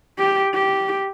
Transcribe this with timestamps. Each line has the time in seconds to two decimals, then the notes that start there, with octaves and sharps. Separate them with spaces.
0.19 G4
0.54 G4